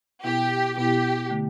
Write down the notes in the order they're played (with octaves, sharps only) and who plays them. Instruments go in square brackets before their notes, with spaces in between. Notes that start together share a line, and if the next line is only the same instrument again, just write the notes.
[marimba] B2 B3 E4 [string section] G4
[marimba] B2 B3 E4 [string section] G4
[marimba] D3 A3